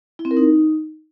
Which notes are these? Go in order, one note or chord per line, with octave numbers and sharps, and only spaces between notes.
E4
C4
A#4
D#4